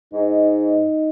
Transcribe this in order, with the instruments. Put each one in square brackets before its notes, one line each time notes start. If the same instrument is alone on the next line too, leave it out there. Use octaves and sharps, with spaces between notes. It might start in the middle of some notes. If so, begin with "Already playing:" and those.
[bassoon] G#2 [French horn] D#4